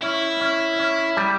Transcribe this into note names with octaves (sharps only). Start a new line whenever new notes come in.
C#4 E4
C#4
C#4
G3